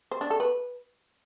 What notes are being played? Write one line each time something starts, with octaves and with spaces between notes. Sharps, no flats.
C5
D4
A4
B4